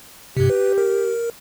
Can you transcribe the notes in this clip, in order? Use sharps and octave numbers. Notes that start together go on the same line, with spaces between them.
G2 C3 G4
B4
A#4